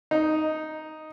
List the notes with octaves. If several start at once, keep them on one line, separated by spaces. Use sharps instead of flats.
D#4